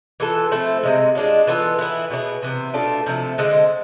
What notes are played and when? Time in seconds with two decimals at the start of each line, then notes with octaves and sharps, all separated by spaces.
0.20 E3 B3 F4 A4
0.51 F3 A3 C4 E4
0.83 C3 E3 G#3
1.15 G#3 D4 F4
1.47 E3 B3 F4 A4
1.79 E3 B3 E4
2.10 B2 B3 D4 G#4
2.42 C3 E3 B3
2.74 B2 A3 D4 F4
3.06 C3 F3 A3
3.38 D3 G#3 C4